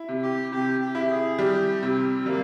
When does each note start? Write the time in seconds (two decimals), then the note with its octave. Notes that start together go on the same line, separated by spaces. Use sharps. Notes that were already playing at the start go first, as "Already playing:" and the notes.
Already playing: E4
0.08 C3
0.22 G4
0.52 C3 G4
0.80 G4
0.95 E4
1.10 G#4
1.39 G3 G4
1.82 C3 C4
2.26 G3 A#3